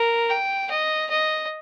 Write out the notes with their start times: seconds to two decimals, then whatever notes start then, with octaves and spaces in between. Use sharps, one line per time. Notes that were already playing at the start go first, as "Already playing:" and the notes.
Already playing: A#4
0.30 G5
0.70 D#5
1.10 D#5